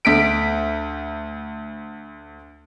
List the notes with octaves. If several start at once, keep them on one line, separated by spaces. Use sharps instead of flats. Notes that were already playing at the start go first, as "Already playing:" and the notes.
D2 B6 D7